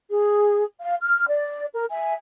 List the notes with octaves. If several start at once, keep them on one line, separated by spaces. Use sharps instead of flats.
G#4
F5
F6
D5
A#4
E5 G#5